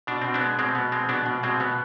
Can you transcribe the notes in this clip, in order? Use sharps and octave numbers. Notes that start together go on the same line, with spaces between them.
B2 D4
B2 C4
B3 D4
G#3
B2 G#3 C4
B2 B3
G#3 C4
B2 B3 D4
B2
B2 G#3 C4
B2 B3